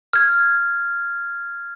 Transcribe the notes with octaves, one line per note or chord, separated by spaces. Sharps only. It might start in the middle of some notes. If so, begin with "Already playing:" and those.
F6 G#6